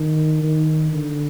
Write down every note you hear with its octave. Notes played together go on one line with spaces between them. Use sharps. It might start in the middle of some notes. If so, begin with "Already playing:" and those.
Already playing: D#3
D#3
D3